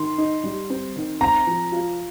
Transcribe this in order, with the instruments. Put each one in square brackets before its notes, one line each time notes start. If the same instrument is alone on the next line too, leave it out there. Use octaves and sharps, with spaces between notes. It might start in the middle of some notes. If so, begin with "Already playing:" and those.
Already playing: [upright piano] D#3 [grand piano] C6
[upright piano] D#4
G3
C4
D#3
[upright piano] C4 [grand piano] A#5
[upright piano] F3
F4